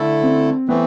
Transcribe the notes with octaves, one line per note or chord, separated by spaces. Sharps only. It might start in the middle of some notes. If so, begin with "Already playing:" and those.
Already playing: D3 A3 E4 A4
C4
E3 A3 B3 C4